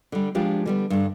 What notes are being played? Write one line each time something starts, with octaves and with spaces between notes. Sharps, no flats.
D3 G3
F3 G#3 D4 F4 G4
D3 G3 B3
G2 D3